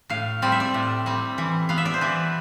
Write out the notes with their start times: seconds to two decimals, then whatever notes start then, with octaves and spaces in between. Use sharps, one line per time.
0.10 A2 F5
0.42 G3 C4 D5
0.52 E5
0.60 D5
0.74 A2
1.06 G3 C4
1.38 E3
1.69 B3 F5
1.78 E5
1.85 D5
1.94 C5
2.01 E3 B4